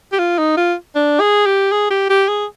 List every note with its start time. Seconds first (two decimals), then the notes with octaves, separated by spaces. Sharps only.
0.13 G4
0.19 F4
0.39 D#4
0.57 F4
0.95 D4
1.20 G#4
1.46 G4
1.72 G#4
1.91 G4
2.10 G4
2.29 G#4